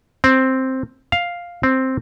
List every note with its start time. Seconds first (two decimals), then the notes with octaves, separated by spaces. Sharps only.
0.24 C4
1.12 F5
1.63 C4